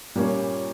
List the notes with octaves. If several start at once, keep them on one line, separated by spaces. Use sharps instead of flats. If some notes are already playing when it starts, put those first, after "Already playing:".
A#2 G3 A#3 C#4